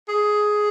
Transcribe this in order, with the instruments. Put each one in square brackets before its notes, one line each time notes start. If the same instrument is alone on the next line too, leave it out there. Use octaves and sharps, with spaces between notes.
[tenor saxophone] G#4